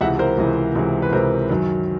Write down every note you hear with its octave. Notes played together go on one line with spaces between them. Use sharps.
C#2 C3 E3 E5 F#5
A#4 C5
C#2 C3 E3
C#2 C3 E3
B4
C#2 C3 E3 A#4 C5
F#2 D#3 F#3